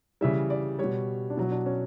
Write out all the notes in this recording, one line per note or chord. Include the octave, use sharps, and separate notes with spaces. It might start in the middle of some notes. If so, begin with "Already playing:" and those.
C#3 E3 G3 E5
D5
B2 G3 C#5
D4
B2 F#3 E4
D4
C#4